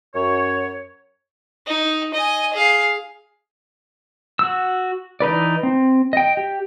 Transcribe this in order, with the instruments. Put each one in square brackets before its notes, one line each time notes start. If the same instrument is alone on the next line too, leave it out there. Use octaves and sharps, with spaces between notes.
[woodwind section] F#2 C#5
[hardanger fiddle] D#4
D#5 G#5
G#4 F5
[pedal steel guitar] F#4 E6
E3 D#4 B4 D5
C4
D#5 G5
G4